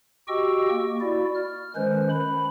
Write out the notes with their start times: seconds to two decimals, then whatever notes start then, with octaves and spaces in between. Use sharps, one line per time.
0.28 F#4 G4 D#5 G5 C#6 E6
0.70 A#3
1.01 E4 F#4 D5
1.35 F6
1.76 D#3 G#3 C#4 B4 C5
2.10 B5